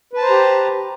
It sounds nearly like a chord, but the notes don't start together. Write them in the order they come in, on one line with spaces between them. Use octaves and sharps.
B4 A5 C5 A#5 G4